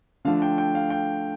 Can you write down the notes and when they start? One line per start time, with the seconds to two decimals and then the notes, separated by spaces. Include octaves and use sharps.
0.25 D3 F3 A3 D4 F5
0.42 G5
0.58 G5
0.75 F5
0.90 G5